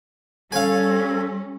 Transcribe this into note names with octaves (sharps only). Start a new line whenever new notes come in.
G3 C#4 A4 F5 G#5